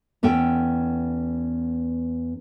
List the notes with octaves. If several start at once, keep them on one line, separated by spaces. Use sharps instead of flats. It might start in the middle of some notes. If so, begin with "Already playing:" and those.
E2 B3 C#4 A4 G5